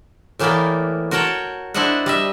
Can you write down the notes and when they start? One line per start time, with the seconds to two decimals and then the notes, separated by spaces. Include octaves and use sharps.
0.39 A2 E3 A#3 B3 D5 G5
1.11 F#4 A#4 C#5 G5 A5
1.74 D4 E4 C5 D#5 E5 F#5
2.06 G3 D#5 E5